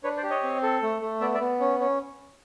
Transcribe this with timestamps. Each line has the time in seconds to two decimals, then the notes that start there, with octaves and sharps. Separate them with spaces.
0.04 D4 B4 C#5
0.17 C5 D5
0.23 G4
0.30 C#5 D#5
0.43 C4
0.63 A4
0.82 A3
1.01 A3
1.21 B3 D5 E5
1.34 D5 E5
1.40 B3
1.60 C#4
1.80 C#4